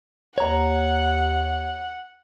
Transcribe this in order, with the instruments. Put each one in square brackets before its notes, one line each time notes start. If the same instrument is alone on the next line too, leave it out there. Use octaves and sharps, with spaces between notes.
[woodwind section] D#2 [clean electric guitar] C#5 A#5 [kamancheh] F#5